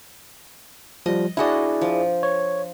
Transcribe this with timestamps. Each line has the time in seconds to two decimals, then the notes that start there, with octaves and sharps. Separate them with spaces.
1.06 F3 G3 D#5
1.37 D4 E4 F#4 G#4 D5 D#5
1.81 F3
2.23 C#5